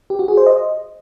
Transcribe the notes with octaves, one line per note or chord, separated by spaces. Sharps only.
G4
F#4
G#4
C5
D#5